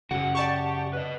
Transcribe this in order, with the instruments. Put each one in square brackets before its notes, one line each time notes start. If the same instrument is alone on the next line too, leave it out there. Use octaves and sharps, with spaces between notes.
[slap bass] F#2 C#3 [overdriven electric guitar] F#4 G#4 [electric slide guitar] F#5
[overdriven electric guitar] G4 [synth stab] D5 A5 C#6
[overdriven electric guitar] B4 D#5